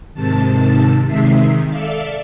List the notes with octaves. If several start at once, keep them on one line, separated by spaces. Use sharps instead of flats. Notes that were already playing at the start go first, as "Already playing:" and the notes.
G#2 C3 D#3 A5
C3 D#3 G#3 E5 B6 C7
D#3
A4 D5 E5 F5